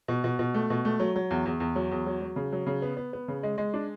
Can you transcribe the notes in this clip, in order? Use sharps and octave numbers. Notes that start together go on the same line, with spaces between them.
B2
B2
B2
A3
B2
A3
F#3
F#3
E2
E2
E2
F#3
E2
F#3
F#3
C#3
F#3
C#3
B3
B3
B3
C#3
G#3
G#3
D4